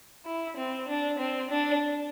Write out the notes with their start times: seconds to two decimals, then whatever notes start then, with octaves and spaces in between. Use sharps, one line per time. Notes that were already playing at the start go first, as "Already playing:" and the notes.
0.25 E4
0.57 C4
0.88 D4
1.19 C4
1.50 D4